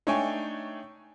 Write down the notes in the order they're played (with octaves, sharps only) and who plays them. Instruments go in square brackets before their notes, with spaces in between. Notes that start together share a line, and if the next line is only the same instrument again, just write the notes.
[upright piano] A3 D4 D#4 C#5 G5 G#5